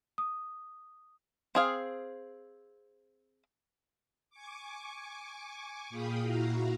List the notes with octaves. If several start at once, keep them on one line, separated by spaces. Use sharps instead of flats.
D#6
C4 G#4 F5
G#5 C#6 D6
A#2 G#4 F5 G5 B5 D#6
A#2 E4 F#4 F5 A#5